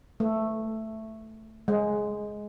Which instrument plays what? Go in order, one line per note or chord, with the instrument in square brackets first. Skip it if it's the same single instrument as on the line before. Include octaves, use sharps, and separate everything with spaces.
[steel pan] A3
G#3